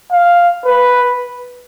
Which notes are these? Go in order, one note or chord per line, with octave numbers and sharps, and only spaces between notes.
F5
B4